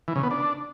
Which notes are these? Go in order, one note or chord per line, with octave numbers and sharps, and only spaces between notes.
E3
C#3
B3
D4